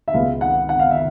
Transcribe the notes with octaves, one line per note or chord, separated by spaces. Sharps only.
E5
C#2 B2 G#3 B3 F5
F#5
F#5
F5
E5